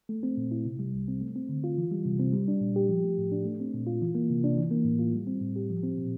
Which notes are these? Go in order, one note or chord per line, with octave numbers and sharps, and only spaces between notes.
A3
C4
A#2
E4
C3
G3
C2
C4
A3
C4
D3
F4
E3
G3
C3
C4
G3
D4
A#2
G4
F3
A3
A2
D4
A3
C4
A#2
F4
E3
A#3
C3
D4
E3
A#3
A2
F4
G3
C4
A2
G4
F3
C4
A#2